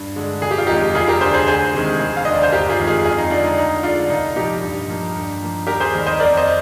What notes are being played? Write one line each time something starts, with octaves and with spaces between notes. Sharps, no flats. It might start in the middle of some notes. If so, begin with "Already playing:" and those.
Already playing: G2
D3 G#3
F1 G#4
G4
F4
F2 D#3 G#3 D#4 G4
F1 F4 G#4
G4 A#4
D#2 D3 G#4 C5
G#4 C5
D2 G#4 C5
C3 D#3 G#3
F1
F5
D#2 D3 D#5
D5
C5
G1 G4 A#4
F4 G#4
F2 D#3 G#3
F4 G#4
F2 F4 G#4
D#4
D3 G#3 D4 F4
D#4
D2 D#4
D3 G#3 D4 F4
C2 D#4
A#2 F3 D#4 G4
G2
F3 A#3
G2
F3 A#3
D#2 G4 A#4
G#4 C5
D#3 G3 A#3
C5 D#5
F2 A#4 D5
C5 D#5